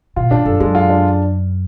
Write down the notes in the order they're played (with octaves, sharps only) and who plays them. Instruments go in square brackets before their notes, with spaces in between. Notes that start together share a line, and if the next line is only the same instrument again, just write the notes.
[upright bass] B2 [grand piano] F4
[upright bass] A2 [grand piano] D4
[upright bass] F#2 [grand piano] A4
[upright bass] F#2 [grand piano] G#3
[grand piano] F4
D4